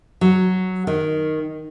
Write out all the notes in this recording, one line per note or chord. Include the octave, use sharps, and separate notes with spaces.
F#3
D#3